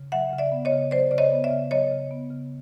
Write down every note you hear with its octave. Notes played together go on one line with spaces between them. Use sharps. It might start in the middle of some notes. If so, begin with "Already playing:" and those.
Already playing: C#3
F#3 E5 F#5
C#3
D5 E5
B3
C#5 D#5
C#3
F#3 C5 D5
C#3 D5
C#5 D#5
B3
D5 E5
C#3
F#3 C#5 D#5
C#3
B3
C#3